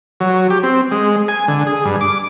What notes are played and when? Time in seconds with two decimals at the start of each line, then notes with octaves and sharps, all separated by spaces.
0.20 F#3
0.50 G4
0.63 C4
0.91 G#3
1.28 G#5
1.48 D3
1.67 G#4
1.85 G2
2.01 D6